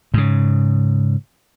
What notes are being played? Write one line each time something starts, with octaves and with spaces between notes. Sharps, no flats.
G#2 C#3